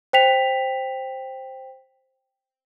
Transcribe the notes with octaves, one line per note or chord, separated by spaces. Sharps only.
C5 G5 B6 F7